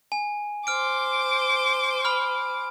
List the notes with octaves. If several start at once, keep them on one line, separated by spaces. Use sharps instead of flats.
G#5
C5 D6 F6 D7
B5 F6